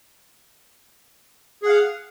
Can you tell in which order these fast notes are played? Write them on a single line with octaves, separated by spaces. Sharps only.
G#4 F#5 F5